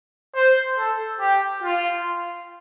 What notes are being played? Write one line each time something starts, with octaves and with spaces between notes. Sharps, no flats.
C5
A4
G4
F4